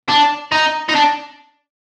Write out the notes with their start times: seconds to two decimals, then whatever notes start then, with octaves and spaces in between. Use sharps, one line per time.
0.09 D4
0.52 D#4
0.89 D#4
0.95 D4